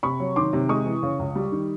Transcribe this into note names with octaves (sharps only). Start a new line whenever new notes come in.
C3 B5 C#6
F#3
D#3 C6 D6
C3
G#3 C#6 D#6
E3
C#3
C#2
G3
D#3